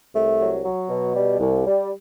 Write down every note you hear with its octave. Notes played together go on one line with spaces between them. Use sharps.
C2 A3
F#3
F#3
B2
G3
C2
G3